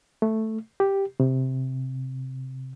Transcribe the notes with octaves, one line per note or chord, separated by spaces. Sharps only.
A3
G4
C3